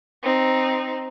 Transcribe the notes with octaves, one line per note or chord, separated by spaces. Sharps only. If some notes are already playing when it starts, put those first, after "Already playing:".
C4 D#4